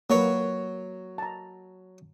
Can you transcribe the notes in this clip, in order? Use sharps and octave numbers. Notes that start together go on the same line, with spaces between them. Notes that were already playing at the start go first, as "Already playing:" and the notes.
F#3 A#3 B4 C#5
A5 A#5